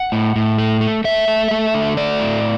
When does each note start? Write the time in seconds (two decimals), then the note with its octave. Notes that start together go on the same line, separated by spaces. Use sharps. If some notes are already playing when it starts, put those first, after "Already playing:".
Already playing: F#5
0.12 A2
0.36 A2
0.58 A3
0.81 A3
1.04 A3 E5
1.28 A3
1.51 A3
1.74 D3
1.97 A3 D5
2.20 A2